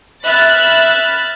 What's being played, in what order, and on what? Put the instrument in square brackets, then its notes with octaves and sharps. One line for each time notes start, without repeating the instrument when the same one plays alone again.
[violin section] E5 B5 F6 F#6 A6